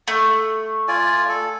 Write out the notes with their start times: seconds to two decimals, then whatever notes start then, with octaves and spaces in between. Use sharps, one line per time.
0.08 A3
0.88 F4 D5 G#5
1.29 A4